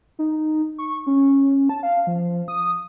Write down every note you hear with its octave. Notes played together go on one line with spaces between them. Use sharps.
D#4
C#6
C#4
A5
F5
F3
D#6